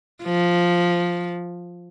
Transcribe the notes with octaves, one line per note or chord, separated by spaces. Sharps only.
F3